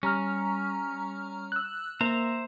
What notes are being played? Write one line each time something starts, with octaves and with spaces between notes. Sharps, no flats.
G3 C#4 A#5 F6
E6 F#6
A#3 C5 E5 A#5